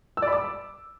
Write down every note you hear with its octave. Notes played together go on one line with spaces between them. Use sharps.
E6
D5
B5
D6